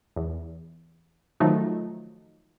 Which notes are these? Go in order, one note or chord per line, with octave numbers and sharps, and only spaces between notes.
E2
D#3 F3 F#3 A3 D#4